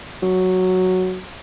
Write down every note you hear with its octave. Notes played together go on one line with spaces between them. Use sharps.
F#3